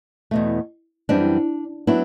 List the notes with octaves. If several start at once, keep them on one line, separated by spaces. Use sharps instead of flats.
E2 B2 A3
F#2 E3 G3 C4 D4
F#3 B3 D4 E4